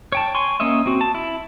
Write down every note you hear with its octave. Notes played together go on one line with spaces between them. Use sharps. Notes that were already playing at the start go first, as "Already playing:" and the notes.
C#5 G5 A5
G#5 C6 C#6
A#3 C#4 C#5 D#5 E5
C4 F#4
A5
E4